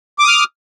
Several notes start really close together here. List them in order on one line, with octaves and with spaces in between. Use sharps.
D6 D#6 F6